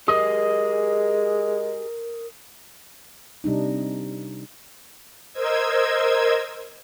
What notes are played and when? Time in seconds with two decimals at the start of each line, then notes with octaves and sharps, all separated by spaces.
0.08 G#3 G4 G#4 A#4 D#5 D#6
3.44 C3 G3 D4 D#4
5.33 A#4 C5 D#5 E6 G#6